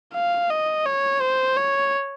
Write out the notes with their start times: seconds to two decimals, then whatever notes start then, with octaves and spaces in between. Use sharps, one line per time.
0.15 F5
0.50 D#5
0.86 C#5
1.21 C5
1.57 C#5